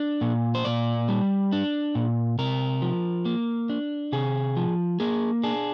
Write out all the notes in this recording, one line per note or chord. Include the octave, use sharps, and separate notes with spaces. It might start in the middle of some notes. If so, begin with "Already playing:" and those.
Already playing: D4
A#2
C5
A#2 D5
G3
D4
A#2
C3 A#4
F3
A#3
D4
C3 G#4
F3
A#3 G#4
D4 G#4